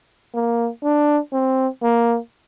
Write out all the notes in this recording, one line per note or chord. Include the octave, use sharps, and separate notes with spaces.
A#3
D4
C4
A#3